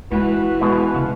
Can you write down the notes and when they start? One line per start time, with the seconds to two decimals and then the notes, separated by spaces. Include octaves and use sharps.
0.11 E3 G#3 F4 F#4 B5
0.61 B2 G#3 G#4
0.94 C#3 F4 F#5